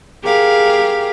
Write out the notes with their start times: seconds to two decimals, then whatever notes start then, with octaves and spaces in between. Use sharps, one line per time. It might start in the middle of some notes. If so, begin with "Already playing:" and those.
0.24 G4 G#4 A#4 F5